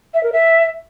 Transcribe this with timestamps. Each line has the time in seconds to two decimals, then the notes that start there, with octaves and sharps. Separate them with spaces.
0.14 E5
0.23 A#4
0.33 E5